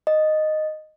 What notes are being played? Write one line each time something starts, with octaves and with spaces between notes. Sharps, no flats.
D#5